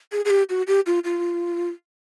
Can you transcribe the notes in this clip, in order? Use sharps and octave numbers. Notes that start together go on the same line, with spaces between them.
G#4
G#4
G4
F#4
G4
F4
F4